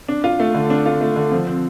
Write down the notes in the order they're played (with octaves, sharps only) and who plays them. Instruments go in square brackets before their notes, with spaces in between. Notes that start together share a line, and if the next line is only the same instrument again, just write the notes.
[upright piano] D4
F4
A3
D3
D4
F4
A3
D3
F3
C4